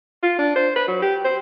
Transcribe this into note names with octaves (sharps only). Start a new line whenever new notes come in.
F4
D4
C5
B4
F#3
G4
C5